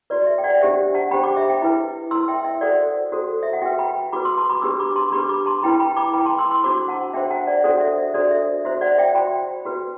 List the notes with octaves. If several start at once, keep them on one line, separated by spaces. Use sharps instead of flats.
F#4 B4 D5
E5
G5
D5 F#5
D4 G4 C5 E5
F#5 A5
D4 G4 C5 G5 B5
B5 D6
E5
E5 G5
E4 B4
E4 B4 C6 E6
E5 G5
E5
F#4 A4 C5 D5 F#5
F#4 A4 C5
E5
F#5
F#4 B4 E5 G5
G5 B5
F#4 B4 B5 D6
C6 E6
A5 C6
B5 D6
D4 G4 B4 C6 E6
B5 D6
A5 C6
D4 G4 B4 B5 D6
B5 D6
A5 C6
E4 B4 G5 B5
G5 B5
B5 D6
E4 B4 G5 B5
A5 C6
C6 E6
C6 E6
D4 F#4 C5 B5 D6
F#5 A5
D4 F#4 C5 E5 G5
F#5 A5
D5 F#5
D4 F#4 A4 C5 D5 F#5
E5
E5
D4 F#4 A4 C5 D5
E5
F#4 C5 E5
D5 F#5
E5 G5
F#4 C5 G5 B5
F#4 B4